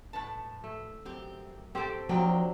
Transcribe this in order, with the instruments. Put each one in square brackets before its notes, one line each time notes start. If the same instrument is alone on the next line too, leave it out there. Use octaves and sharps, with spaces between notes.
[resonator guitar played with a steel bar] A2 B4 A5
[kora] A3
[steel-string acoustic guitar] F#2 [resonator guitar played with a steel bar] C4 G4
[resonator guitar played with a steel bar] A2 A4 [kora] C4 G4 C5
[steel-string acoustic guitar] F3 A#3 G5 [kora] F#3 [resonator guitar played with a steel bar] C4 D4 G4